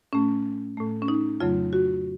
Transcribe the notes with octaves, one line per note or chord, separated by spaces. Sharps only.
A2 A3 C#4
A2 A3
C#4
D#4
F2 C#3 F#3 A3 F4
F#4